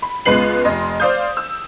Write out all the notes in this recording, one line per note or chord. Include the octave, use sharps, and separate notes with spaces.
B5
C#2 G#3 B3 B4 C7 F#7
F1 D#5 C6
C5 D5 F5 D#6 G6
E6